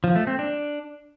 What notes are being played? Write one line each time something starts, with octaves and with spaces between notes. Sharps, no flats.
F3
A3
C4
D4